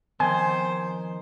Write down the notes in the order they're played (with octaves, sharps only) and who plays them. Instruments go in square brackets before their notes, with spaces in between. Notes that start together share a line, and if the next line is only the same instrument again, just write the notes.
[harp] D#3 [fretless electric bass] F3 B3 C4 [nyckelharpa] C5 [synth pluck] G#5